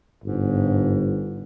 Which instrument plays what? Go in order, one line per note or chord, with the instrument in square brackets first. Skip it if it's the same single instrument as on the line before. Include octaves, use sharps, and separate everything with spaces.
[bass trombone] G1 [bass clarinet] G#2